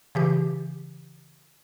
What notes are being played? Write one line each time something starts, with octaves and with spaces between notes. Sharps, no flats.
C#3 E3 G4